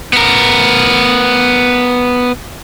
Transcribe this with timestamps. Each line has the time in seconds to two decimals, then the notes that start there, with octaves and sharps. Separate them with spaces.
0.13 B3 A#4